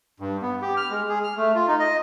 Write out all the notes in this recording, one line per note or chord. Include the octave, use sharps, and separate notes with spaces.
G2
B3
G4
F6
G#3
G#4
F6
A3
F4
D#4
D#5